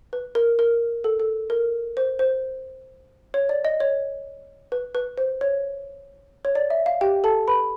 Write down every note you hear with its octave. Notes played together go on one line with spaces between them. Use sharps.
B4
A#4
A#4
A4
A4
A#4
C5
C5
C#5
D5
D#5
C#5
B4
B4
C5
C#5
C#5
D5
E5
F5
G4 G5
A4 A5
B4 B5